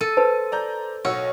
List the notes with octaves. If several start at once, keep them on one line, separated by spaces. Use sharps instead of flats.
A4 D#7
B4 C5 A5
D5 A#5 G6
B1 F#4 C#5 E6